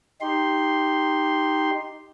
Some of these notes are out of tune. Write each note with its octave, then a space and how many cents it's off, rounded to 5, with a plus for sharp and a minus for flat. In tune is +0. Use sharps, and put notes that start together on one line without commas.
D#4 +0 G4 +0 C6 +0